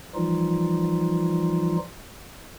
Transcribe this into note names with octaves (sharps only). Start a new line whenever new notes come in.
E3 F3 G3 D#4 F4